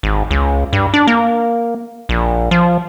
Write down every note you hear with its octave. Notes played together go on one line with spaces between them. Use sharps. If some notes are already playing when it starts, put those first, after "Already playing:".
G#1
C#2
G2
D4
A#3
A#1
F3